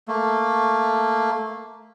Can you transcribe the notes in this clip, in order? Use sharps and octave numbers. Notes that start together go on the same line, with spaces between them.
A3 A#3